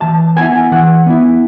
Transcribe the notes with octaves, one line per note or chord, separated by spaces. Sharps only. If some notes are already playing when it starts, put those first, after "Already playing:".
E3 A5
B3 E4 G#5
E3 F#5
B3 E4